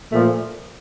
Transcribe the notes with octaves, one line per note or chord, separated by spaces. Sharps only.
A#2 F3 A3